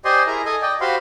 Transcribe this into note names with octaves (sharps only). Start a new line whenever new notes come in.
G4 C5 D5 D#5 G#5 C6
E4 G#4 A#4 A#5
A4 D#5 G#5
D5 D#5 G5
F#4 G4 C5 F5 B5 C6